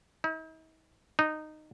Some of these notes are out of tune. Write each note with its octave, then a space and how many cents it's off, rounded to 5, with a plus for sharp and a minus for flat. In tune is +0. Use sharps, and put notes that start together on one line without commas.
D#4 +45
D#4 -15